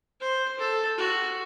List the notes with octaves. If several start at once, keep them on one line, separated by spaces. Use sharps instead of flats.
C5
A4
F#4